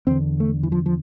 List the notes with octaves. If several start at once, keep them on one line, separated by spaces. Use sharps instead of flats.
E2 D3 C4
A3
E3
F3
F3